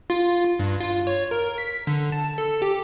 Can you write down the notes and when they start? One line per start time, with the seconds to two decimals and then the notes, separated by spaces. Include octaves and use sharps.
0.10 F4
0.59 G2
0.80 F4
1.07 C#5
1.31 A#4
1.58 B6
1.87 D3
2.12 A5
2.38 A4
2.62 G4